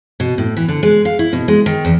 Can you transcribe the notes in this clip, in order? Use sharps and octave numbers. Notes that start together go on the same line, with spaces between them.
B2
A2
E3
D3
G#3
F5
E4
B2
G#3
D#3
E2